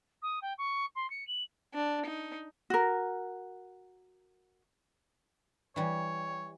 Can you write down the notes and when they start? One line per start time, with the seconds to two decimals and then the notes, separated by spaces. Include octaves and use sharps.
0.22 D#6
0.42 G5
0.58 C#6
0.95 C6
1.10 C#7
1.27 F#7
1.74 D4
2.05 D#4
2.70 F#4 A#4
5.76 E3 G3 C#5